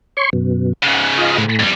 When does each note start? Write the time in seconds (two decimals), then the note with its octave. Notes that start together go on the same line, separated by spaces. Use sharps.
0.17 C#5 C6 C#6
0.33 F#2 B2
0.83 G#2 C#3 F#5
1.17 F4 D#5
1.38 A2
1.59 F2 G3